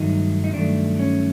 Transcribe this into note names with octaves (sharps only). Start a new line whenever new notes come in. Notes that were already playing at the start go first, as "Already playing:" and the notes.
Already playing: G2 D#3 F#3 A3 D#4
D#4
G2 D#3 F#3 A3 D4
C#4